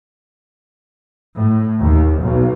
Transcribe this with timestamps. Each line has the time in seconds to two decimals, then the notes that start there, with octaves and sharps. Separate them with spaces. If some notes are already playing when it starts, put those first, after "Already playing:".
1.38 A2
1.79 D#2
2.21 B1